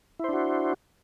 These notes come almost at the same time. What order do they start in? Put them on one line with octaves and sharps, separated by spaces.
E4 C5 D4 F#4